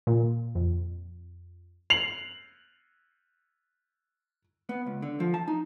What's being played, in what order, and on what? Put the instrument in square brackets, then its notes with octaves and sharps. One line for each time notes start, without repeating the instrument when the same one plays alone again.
[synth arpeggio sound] A#2
F2
[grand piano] C7 F7 F#7
[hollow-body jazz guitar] B3
C#2
D3
F3
A5
D#4